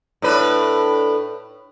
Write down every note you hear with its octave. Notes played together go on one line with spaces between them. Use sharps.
A2 D4 B4